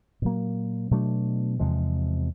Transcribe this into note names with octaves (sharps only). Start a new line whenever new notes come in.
A#2 F#3 A#3
B2 F#3 A3 D4
E2 C3 F3 G#3